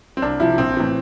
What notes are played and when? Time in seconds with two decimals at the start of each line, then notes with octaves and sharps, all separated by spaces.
0.17 C4
0.22 C2 D4
0.40 C3 F3 E4
0.58 A#1 C4
0.77 A2 E3